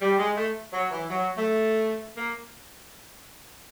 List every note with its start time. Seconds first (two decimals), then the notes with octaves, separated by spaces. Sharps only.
0.01 G3
0.18 G#3
0.36 A3
0.73 F#3
0.90 E3
1.09 F#3
1.37 A3
2.17 A#3